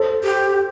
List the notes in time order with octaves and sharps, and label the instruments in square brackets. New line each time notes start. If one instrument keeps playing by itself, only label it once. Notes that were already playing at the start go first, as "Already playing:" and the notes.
Already playing: [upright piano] A4 C5
[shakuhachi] G4